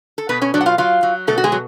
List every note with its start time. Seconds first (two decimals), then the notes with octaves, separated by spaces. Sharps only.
0.18 A4
0.29 B2 B3 B4
0.42 C#4 C#5
0.54 F#3 D4 D5
0.61 F#5
0.66 F4 F5
0.78 F#3 F4 F5
1.03 F#3
1.27 B2 A3 A4
1.38 F#4
1.44 G#3 G#4
1.52 F#3